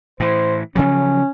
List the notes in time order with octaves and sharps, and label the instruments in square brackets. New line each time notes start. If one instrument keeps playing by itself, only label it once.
[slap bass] A2 E3 [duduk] C5
[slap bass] C#3 F3 F#3 [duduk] C#4